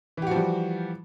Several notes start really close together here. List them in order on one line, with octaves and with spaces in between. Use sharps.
E3 G4 F#4 F3 G3